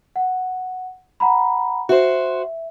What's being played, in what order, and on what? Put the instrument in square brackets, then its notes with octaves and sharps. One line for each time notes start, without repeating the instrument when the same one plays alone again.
[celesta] F#5
F#5 A#5 B5
[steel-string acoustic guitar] F#4 C5 [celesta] E5